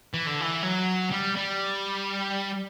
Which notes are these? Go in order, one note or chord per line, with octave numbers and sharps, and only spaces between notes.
E3
D3
E3
F#3
G3
G3